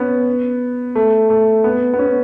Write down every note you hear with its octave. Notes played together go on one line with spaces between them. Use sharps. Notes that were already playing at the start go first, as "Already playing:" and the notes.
Already playing: B3 C#4
A3
A3
B3
B3
C#4